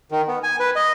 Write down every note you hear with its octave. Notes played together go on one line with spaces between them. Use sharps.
D#3
B3
G#5
B4
D#5